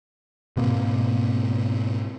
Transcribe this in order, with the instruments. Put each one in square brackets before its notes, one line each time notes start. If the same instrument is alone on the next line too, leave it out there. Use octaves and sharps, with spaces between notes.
[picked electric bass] G#2 B2 A#3 C4